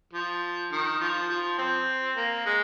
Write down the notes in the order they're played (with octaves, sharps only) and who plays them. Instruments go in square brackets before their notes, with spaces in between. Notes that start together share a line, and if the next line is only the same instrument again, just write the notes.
[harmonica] F3
D#3
F3
F3
C4
A#3
G#3